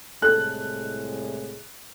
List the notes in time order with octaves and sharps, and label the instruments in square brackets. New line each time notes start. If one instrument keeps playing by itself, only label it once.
[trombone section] C2 A2 G#3 [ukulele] A4 [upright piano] F#6